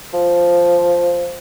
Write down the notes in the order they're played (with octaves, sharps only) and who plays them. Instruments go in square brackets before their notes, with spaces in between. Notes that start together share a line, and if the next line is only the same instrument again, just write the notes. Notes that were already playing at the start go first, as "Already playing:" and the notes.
[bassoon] F3